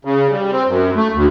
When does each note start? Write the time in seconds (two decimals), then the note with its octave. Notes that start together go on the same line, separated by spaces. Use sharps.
0.05 C#3
0.31 G3
0.52 C4
0.68 F#2
0.96 A3
1.14 D2